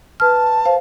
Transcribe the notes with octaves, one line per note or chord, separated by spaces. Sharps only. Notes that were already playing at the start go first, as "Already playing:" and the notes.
B4 A5 F6
C5 F5